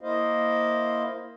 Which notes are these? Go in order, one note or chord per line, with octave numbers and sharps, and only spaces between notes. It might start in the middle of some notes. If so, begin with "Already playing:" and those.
A#3 E4 C5 D#5 F5